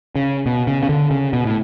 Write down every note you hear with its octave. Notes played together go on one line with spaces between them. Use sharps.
C#3
B2
C#3
C#3
D3
C#3
B2
A2